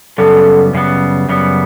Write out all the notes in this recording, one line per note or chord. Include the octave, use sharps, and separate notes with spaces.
F#2 C#3 G3 B3 A4
F#2 C#3 G3 B3
F#2 C#3 G3 B3